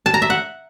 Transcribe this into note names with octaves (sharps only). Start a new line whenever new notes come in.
A5
A#5
E5
F#5